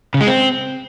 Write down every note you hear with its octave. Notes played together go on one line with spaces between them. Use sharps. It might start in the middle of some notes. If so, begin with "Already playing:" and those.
C#3
G#3
C4